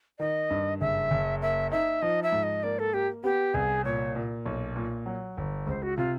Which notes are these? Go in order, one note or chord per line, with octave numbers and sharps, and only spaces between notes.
D#3 D#5
G2
F#1 E5
F#1
A#3 E5
D#4 E5
F3 D#5
E5
G#2
D#5
A#3 D5
A4
A#3 G4
B3 G4
C2 G#4
A#2 C#5
A#2
B1
A#2
F#3
G1
C#2 C5
F#4
C3 F4